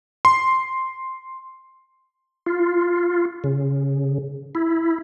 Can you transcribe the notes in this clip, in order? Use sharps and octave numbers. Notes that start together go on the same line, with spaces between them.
C6
F4
C#3
E4